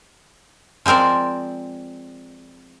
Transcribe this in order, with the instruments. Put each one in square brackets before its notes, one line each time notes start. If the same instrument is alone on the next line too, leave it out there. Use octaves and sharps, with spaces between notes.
[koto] F3 G#3 C4 A#4 D5